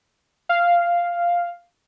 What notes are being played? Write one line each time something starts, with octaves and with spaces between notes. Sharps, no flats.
F5